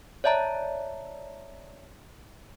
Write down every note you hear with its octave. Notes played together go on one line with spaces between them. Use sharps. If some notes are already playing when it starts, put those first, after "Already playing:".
C#5 D5 E5 A5 A#5